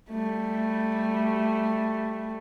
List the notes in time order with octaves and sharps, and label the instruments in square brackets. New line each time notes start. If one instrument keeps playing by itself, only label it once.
[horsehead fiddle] G3 A3